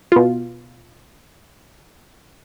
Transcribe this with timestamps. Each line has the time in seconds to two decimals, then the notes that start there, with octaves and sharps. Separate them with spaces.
0.12 B2 F4